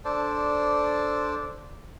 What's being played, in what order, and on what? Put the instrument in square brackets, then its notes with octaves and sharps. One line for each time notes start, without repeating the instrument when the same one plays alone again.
[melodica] D4 A4 C5 D5